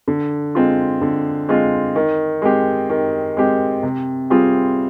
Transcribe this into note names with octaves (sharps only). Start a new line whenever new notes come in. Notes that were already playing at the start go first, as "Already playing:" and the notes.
D3
G#3 C4 F4
D3
G#3 C4 F4
D#3
G#3 C4 G4
D#3
G#3 C4 G4
C3
G3 C4 F4 G#4